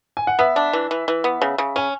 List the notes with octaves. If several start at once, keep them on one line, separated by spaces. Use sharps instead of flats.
G#5
F#5
B3 E5
D4
E3
E3
E3
B3
C#3
C#3
C#4 G#5